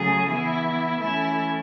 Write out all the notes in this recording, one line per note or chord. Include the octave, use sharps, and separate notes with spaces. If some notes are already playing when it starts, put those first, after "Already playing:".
Already playing: C#3 F#3 A3 C#4 G#4
E3 B3 E4
E3 A3 C#4 E4